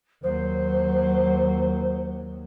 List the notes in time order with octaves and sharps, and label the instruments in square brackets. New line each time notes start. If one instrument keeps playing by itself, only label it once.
[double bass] D#2 F#3 [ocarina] C5